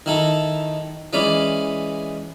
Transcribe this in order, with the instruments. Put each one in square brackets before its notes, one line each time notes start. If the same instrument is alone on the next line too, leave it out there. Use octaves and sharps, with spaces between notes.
[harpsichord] D#3 E4 A4
E3 G#3 C#4 D5 B5